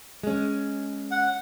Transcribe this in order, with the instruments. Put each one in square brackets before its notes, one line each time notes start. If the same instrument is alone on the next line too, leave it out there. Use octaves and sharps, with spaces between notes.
[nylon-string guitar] G#3 C#4
[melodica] F#5